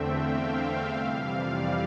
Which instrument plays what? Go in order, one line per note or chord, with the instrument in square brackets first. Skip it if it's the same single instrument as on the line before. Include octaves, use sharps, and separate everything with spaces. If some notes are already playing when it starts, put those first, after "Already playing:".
Already playing: [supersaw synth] E2 D3 A3 C4 E5 G5
F5
F2 C3 E3 G3 F5
D5